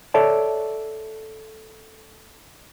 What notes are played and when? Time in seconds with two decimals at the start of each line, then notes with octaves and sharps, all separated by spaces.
0.14 A4 C#5 D5 E5 A5